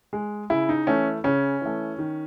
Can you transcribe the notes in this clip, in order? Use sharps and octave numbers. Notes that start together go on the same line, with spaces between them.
G#3
C#3 E4
D#4
E3 A3 C#4
C#3 C#4
E3 A3
D#3